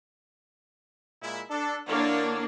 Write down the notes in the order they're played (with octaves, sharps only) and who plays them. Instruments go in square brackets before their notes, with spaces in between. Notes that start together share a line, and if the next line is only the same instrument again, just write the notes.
[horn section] A#2 G#3 E4
D4 A4
[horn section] D3 E4 C#5 [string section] A#3 D4